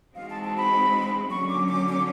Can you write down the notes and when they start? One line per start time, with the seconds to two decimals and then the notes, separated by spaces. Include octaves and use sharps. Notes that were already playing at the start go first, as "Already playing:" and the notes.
0.15 E3 G#3 C4 D#4 F#4 F5
0.30 A5
0.44 A5
0.58 B5
1.30 D3 F#3 A#3 C#4 C#6
1.49 D6
1.69 D6
1.88 D6